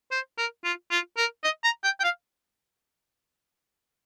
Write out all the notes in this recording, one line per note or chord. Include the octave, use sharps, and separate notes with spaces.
C5
A#4
F4
F4
A#4
D#5
A#5
G5
G5
F5